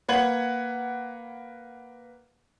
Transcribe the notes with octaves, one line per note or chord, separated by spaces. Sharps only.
A#3 B4 F#5 G#6 F#7